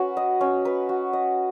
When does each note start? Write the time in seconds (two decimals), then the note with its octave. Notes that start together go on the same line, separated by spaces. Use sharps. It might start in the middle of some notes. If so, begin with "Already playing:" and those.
Already playing: C#4 F#4 B4
0.17 D#5
0.41 C#4
0.65 B4
0.89 F#4
1.13 D#5